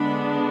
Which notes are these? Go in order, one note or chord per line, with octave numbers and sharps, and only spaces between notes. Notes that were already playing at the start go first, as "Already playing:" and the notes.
Already playing: D3 G#3 B3 D4 B5